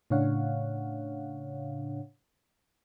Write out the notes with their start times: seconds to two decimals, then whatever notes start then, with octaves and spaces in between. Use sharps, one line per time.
0.10 A2 C#3 D4 C#5 F5 F#5